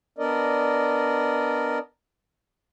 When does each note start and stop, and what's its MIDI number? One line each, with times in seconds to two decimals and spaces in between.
0.18 1.79 59
0.18 1.79 62
0.18 1.79 70
0.18 1.79 74
0.18 1.79 75